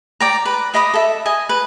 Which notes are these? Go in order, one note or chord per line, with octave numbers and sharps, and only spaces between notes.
D5 G5 A#5
B4
G4 D#5 B5 D#6
A4 E5
D#5 G#5
B4